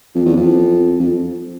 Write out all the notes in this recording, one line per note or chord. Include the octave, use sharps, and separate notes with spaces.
F2
E2
F2
F2